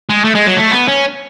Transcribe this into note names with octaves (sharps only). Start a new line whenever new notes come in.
G#3
A3
G#3
F#3
A3
B3
C#4